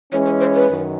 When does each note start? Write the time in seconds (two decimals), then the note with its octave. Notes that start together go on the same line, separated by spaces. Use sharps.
0.12 E3 G#3 C#4 C#5
0.25 C#5
0.40 C5
0.54 B4
0.68 F#2 D#3